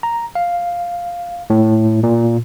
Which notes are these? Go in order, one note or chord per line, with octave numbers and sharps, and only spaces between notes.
A#5
F5
A2
A#2